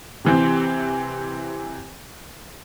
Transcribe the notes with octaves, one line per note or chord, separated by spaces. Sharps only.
C3 E3 C4